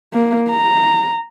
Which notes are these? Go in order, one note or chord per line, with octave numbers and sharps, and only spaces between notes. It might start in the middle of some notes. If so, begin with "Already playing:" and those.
A#3
A#5